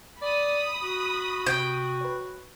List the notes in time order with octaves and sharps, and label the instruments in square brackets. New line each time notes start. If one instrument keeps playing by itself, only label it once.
[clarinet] D5 [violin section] B5 D#6
[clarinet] F#4
[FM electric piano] C3 [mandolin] G5
[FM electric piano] B4 C#5